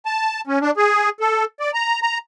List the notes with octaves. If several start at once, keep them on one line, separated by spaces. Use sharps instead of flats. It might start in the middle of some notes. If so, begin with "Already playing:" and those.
A5
C#4
D4
G#4
A4
D5
A#5
A#5